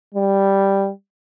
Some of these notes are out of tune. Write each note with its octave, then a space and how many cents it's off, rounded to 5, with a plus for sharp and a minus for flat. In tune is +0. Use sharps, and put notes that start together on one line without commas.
G3 +0